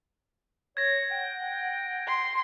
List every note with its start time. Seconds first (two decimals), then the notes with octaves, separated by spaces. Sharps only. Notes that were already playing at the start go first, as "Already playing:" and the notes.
0.77 C#5 G#6 A#6
1.11 F#5 G5
2.07 C6